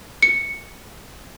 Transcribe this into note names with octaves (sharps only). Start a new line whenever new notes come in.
C#7